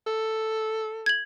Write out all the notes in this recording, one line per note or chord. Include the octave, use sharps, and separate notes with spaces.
A4
G#6 F#7